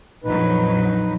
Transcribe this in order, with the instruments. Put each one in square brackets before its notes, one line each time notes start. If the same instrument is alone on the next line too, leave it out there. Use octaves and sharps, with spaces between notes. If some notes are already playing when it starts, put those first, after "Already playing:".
[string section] A#1 F2 F#3 [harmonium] D#4 B4